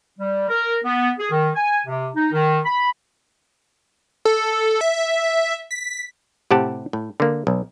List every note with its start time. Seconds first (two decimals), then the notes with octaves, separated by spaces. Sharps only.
0.18 G3
0.48 A#4
0.84 B3
1.19 G#4
1.31 D#3
1.55 G#5
1.86 C3
2.15 D#4
2.32 D#3
2.65 B5
4.25 A4
4.81 E5
5.71 B6
6.51 A2 C3 G4 F#5 A5
6.93 A2
7.20 D3 A#3
7.47 B1